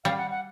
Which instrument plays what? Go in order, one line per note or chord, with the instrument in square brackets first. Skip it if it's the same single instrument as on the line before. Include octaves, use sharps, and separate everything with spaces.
[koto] G3 [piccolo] F5
[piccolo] F#5
F#5